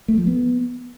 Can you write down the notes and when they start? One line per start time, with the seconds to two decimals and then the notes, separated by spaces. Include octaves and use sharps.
0.08 A3
0.18 F3
0.27 B3